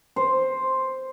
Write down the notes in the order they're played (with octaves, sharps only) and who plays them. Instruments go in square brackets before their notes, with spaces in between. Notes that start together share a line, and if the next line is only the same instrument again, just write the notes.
[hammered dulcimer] C5